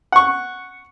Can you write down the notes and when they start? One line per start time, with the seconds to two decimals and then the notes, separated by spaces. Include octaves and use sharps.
0.12 F#5 C#6